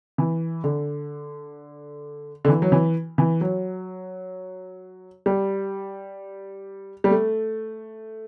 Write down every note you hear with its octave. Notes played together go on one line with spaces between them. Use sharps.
E3
D3
D3
E3
F#3
E3
E3
F#3
G3
G3
A3